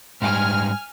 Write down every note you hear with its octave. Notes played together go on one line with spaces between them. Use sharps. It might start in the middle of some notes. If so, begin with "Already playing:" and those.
G#2 G3 G#5 F6